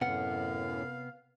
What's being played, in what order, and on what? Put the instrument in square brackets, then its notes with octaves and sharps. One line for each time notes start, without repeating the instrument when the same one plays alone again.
[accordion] F#2 A2 [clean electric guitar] C3 B3 [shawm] F5 [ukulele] F#5